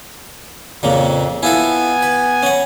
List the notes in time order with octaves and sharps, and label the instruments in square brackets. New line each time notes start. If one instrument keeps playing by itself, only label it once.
[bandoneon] F2 [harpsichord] A#2 C#3 A#3
[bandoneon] B3 G#5 [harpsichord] E4 F4 A4
[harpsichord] B4
C#4 F#5